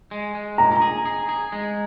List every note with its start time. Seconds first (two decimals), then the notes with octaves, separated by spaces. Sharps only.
0.11 G#3
0.35 G#3
0.58 A#2 A#5
0.82 G#4
1.06 G#4
1.29 G#4
1.52 G#3